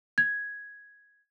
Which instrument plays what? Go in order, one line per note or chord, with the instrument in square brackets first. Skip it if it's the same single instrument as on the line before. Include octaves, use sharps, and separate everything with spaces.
[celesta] G#6